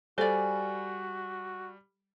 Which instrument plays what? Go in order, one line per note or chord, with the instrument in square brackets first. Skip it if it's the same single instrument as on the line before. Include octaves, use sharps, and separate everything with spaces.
[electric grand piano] G3 [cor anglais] F#4 [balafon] A4 C5 [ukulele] D5 G#5